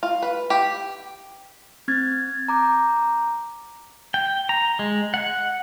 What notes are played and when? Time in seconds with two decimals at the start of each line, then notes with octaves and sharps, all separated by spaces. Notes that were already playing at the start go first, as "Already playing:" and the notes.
0.03 F4
0.22 B4
0.50 G4
1.88 C4 F6 G#6 A6
2.48 A#5 D6 G6
4.14 G5
4.49 A#5
4.79 G#3
5.14 F#5